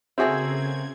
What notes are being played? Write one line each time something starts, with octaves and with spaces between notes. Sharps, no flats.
C#3 A#3 C4 F#4 G#4 A4 E5 G#6